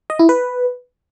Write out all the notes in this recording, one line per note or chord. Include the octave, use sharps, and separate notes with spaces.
D#5
E4
B4